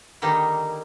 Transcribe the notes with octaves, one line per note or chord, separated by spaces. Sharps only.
D3 D#3 G3 A#3 D#4